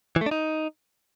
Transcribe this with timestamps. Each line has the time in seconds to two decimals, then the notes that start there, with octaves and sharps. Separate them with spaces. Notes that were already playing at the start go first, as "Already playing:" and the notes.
0.16 E3
0.21 A3
0.26 D4
0.31 D#4